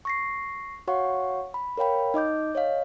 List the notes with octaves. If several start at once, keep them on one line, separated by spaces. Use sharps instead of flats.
C#6 A#6 C7
F#4 C#5 F5 F#5 C#6
B5
A#4 C#5 F5 G5 B5
D#4 D#5 D6 G6
C#5 D#5 F5